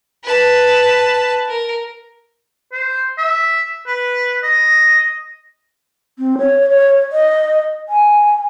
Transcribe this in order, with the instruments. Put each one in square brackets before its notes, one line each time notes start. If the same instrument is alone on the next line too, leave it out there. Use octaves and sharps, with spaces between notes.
[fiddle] B4 A5
A#4
[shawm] C5
E5
B4
D#5
[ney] C4
C#5
C#5
D#5
G#5